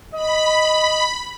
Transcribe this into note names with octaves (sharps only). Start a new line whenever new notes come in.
D#5 B5